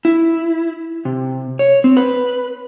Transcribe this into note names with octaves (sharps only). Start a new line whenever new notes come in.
E4
C3
C#5
C4
B4